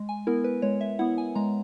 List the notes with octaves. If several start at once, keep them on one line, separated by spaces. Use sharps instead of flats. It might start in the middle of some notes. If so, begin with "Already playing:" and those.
Already playing: G#3
G#5
B3 E4 A#4
B4
G#3 C#5
E5
B3 E4 F#5
G#5
G#3 A#5